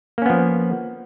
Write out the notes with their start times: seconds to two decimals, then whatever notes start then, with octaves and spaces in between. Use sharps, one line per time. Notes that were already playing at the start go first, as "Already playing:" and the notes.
0.18 A#3
0.22 C#4
0.26 B3
0.30 F3